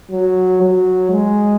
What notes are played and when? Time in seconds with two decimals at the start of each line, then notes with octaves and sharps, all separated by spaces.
0.11 F#3
0.62 F#3
1.11 G#3